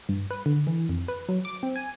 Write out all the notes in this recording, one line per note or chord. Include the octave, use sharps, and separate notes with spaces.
G2
B4
D3
E3
F2
B4
F#3
D6
C4
G#5